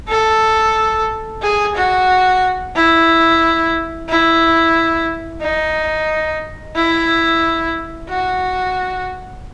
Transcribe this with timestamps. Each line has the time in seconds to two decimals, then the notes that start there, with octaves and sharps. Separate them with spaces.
0.08 A4
1.42 G#4
1.75 F#4
2.75 E4
4.09 E4
5.41 D#4
6.76 E4
8.09 F#4